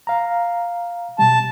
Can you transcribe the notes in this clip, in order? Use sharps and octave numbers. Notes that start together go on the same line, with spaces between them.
F5 A#5
B2 G3 A5